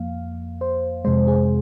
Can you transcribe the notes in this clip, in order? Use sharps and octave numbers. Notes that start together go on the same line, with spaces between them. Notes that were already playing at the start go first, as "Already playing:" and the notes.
Already playing: F2 F3 A#3 F5
C5
F2 C3 G#3 C5
G#4